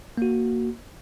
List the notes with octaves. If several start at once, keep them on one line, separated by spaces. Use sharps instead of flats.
A#3 F#4